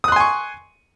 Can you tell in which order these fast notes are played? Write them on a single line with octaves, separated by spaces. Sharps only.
D#6 F#6 C6 G#5 C#6